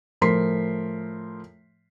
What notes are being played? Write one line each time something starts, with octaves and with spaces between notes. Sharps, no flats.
A2 F3 A#4 C6 B6 C7